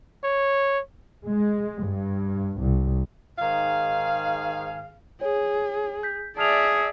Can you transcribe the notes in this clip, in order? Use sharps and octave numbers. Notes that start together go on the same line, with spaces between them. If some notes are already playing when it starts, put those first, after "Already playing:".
C#5
G#3
G2
C2
G#2 D#3 G#4 F5
G#4 C#5
G6 B6
G#4 D5 E5 A5 F6 F7